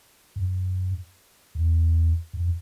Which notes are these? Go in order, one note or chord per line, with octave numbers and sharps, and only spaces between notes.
F#2
E2
F2